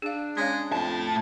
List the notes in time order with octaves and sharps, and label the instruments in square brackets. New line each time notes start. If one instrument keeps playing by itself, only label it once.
[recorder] D4 [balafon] G#4 F5
[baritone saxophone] G#3 [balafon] C#4 C#5 F5
[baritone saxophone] F2 [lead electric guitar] A2 A5